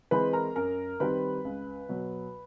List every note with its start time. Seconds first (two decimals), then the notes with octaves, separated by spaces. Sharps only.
0.11 E3 G#3 C4 B4 B5
0.33 A#4 A#5
0.56 F#2 A#4 A#5
1.00 D#3 G3 C4 B4 B5
1.44 C#2
1.89 B2 F#3